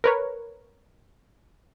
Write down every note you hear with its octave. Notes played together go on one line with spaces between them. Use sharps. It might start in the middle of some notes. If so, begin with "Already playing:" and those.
A#4 B4 C#5